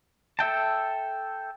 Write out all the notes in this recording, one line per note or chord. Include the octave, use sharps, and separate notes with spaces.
A4 E5 G5 A5